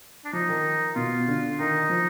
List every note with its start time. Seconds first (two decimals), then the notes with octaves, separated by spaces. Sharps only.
0.25 D4
0.33 F3 D#4
0.49 D#3
0.96 B2 F4
1.27 D3
1.59 D#3 D#4
1.90 F3